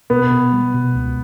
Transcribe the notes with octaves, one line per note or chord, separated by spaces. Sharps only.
B2 B3
B2
G3
B2
C#2